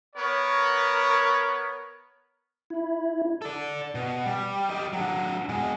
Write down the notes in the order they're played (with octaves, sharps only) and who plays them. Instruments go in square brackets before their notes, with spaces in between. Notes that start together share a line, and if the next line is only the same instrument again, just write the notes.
[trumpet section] B3 A#4 C#5
[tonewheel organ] E4
[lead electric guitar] A4 D5
B2
G3
G4 D#5
F#3 D4
B2 G#3